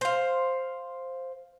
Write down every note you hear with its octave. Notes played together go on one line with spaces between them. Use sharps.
C5 F5